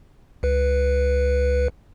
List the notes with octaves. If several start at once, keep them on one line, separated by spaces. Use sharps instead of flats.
C#2 B4